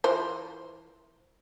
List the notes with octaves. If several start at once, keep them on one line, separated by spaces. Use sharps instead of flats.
E3 F4 C5